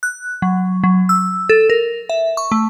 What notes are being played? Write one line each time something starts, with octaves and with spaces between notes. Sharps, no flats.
F#6
F#3
F#3
E6
A4
A#4
E5
C#6
A3